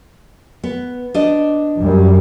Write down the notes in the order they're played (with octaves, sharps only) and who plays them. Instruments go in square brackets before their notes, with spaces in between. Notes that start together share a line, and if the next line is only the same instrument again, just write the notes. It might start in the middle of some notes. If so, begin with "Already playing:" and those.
[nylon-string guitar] B3
D4 D5 D#5
[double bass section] F#2 G3